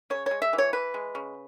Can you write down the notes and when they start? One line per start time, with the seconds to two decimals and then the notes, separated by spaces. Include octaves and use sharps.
0.10 C#3 C#5
0.26 G#3 C#5
0.42 E5
0.53 E3
0.58 C#5
0.73 E3 B4
0.94 G#3
1.15 C#3